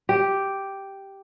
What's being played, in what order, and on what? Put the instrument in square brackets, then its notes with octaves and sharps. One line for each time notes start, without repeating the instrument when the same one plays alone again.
[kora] G4